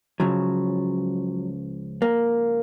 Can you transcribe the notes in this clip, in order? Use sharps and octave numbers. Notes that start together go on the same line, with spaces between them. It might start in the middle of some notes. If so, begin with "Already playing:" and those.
C#2 C#3 F3 F#3
A#3